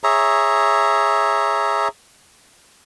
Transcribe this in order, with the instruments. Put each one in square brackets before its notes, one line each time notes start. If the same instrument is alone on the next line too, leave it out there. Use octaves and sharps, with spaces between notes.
[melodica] G#4 C#5 E5 A#5